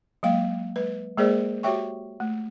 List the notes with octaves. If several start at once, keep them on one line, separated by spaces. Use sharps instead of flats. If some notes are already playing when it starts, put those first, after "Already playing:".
F#3 G#3 A#3 F5 G5
G#3 B4
G#3 A#3 G#4 A#4 C5 D5
F#4 G4 C#5 E5 G5 C#6
A3